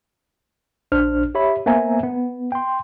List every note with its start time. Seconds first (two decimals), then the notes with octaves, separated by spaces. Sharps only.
0.92 A#1 D4 C5 F6
1.35 G4 C#5 E5 B5
1.66 A#3 B3 C5 E5 G#5 A#5
2.03 B3
2.52 G5 C6